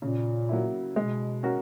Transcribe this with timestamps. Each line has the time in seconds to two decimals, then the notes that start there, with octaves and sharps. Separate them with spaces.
0.02 A#2 C#3
0.49 F#3 A#3 E4
0.96 B2 G#3
1.43 C#4 F#4 A#4